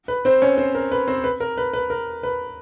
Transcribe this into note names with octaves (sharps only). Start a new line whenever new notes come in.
B4
C4 C5
C#4 C#5
C4 C5
A#4
B4
C4 C5
B4
A#4
B4
B4
A#4
B4